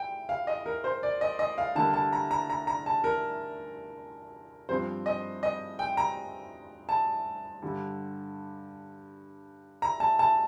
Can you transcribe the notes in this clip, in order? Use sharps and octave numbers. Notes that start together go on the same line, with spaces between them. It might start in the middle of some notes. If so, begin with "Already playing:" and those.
Already playing: G5
F5
D#5
A#4
C5
D5
D#5
D#5
F5
D3 G3 A#3 A5
A5
A#5
A#5
A#5
A#5
A5
A#4
G2 F3 C4 C5
D#5
D#5
G5
A#5
A5
G2 D3 G3
A#5
A5
A5